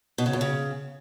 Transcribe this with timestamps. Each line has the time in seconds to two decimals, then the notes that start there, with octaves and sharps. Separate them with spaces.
0.18 B2
0.26 C#3
0.33 F#2
0.41 C#3